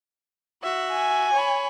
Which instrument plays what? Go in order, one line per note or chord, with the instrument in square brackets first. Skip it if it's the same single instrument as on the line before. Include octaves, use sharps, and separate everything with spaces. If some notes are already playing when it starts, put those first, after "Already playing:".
[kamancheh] F#4 E5
[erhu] G#5
[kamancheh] C#5 B5